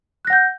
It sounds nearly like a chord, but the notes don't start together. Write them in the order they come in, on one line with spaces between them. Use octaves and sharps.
F#6 A#6 F#5 G6